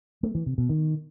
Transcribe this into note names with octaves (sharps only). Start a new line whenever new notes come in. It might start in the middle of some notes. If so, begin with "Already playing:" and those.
A3
E3
C3
B2
D#3